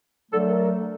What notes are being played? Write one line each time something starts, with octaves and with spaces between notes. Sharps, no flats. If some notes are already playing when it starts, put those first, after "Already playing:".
D3 F#3 A3 A4
A#4